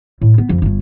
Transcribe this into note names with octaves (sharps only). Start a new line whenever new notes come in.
A2
B3
F2
G1 G2